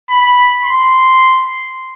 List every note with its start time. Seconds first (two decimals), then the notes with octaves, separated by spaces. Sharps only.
0.10 B5
0.64 C6